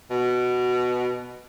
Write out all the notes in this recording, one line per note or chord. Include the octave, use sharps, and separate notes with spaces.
B2